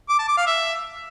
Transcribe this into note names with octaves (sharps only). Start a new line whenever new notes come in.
D6
A5
D6
F5
E5